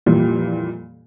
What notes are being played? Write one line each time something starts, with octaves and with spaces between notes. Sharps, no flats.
F2 A#2 E3 G3